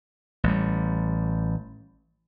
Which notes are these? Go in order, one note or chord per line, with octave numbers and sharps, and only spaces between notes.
A1 G3